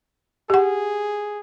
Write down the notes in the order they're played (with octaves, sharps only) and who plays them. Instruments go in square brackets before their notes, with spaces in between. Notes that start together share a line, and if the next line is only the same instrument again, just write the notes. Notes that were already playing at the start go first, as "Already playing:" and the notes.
[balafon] G4 F#5 [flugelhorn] G#4